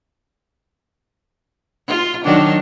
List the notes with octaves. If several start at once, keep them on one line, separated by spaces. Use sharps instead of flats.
F4
D#3 F#3 D4